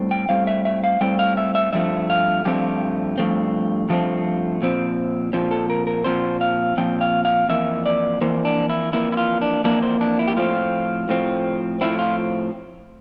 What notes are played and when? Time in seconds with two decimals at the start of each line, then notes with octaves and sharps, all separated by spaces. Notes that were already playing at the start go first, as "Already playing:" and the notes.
Already playing: A2 G3 C4
0.11 G5
0.29 A2 G3 C4 F5
0.47 E5
0.65 E5
0.84 F5
1.01 A2 G3 C4 G5
1.19 F5
1.37 E5
1.55 E5
1.73 G2 F3 A3 C4 E5
2.10 F5
2.45 G2 F3 A3 C4 G4
3.18 G2 F3 A3 C4
3.89 G2 F3 A3 C4
4.62 A#2 F3 C4
5.33 A#2 F3 C4
5.51 A4
5.70 A#4
5.87 A#4
6.04 A#2 F3 C4 C5
6.41 F5
6.77 A#2 F3 C4 G5
7.01 F5
7.25 F5
7.49 F2 E3 A#3 E5
7.86 D5
8.21 F2 E3 A#3 C5
8.45 D4
8.70 E4
8.92 F2 E3 A#3 E4
9.12 E4
9.17 F4
9.41 D4
9.64 F2 E3 A#3 D4
9.83 C5
10.01 D4
10.19 E4
10.27 G4
10.37 A2 F3 C4 F4
11.09 A2 F3 C4
11.81 A2 F3 C4 E4
11.99 F4